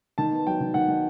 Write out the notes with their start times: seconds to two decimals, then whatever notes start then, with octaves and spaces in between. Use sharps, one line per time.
0.18 D#3 A5
0.32 B3
0.47 F#3 G5
0.61 D#3
0.74 D#3 F#5
0.89 D#3